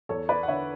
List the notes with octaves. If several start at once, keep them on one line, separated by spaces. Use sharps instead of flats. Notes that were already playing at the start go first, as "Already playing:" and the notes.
E2 A4 C#5
B4 D5
F#5
D3 C#5 E5